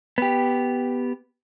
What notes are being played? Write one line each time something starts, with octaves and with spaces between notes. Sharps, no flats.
B3 G4